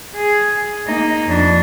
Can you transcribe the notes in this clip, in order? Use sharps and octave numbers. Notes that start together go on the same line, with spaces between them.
G#4
A#3 D#4
F2 D4